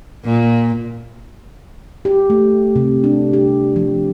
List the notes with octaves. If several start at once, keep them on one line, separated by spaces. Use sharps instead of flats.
A#2
G4
A3
C3
D4
G4
F3